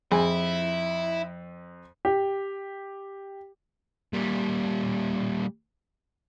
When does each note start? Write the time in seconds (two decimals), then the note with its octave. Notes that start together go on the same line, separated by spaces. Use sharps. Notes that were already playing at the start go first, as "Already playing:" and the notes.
0.12 F2 E4 G#4 G#5
2.05 G4
4.13 A#2 G3